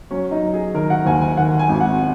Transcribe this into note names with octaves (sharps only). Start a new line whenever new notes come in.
F#3 C#4
D#4
F#3
G#4
D#3 A#4
F#5
D#2 G#5
G#5
D#3 F#5
G#5
G#1
F#5